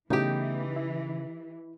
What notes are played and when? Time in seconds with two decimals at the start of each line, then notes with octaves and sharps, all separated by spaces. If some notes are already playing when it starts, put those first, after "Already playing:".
0.10 C#3 E3 A3 B3 D#4 E4 G4
0.76 E4